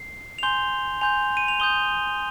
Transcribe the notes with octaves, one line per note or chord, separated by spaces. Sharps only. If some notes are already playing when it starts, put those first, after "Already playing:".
Already playing: C7
F7
G#5 C6 G6 G7
G#5 C6 G6 F7
D#7
F7
C6 D#6 G6 G7